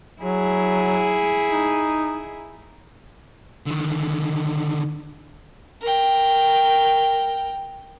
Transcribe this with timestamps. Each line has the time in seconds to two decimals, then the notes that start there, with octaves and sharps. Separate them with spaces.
0.21 F#3 E4 G#4
1.51 D#4
3.67 D3 D#3
5.82 A#4 G5